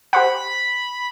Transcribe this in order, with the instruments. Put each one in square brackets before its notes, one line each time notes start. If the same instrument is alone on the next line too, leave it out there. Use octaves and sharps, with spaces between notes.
[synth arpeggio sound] G4 C5 F#5 [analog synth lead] B5